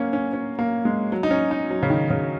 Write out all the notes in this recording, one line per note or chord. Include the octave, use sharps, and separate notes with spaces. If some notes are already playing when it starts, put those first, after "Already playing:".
Already playing: F#3 A#3 C#4
C#4
C#4
A#3
G#3
F#3
D#4
C#4
D#4
F#3
C#3
D#3
C#3